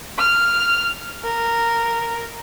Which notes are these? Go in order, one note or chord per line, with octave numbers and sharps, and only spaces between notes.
F6
A#4